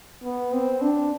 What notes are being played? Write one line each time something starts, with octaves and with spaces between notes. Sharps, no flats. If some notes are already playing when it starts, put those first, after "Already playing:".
B3
C4
D4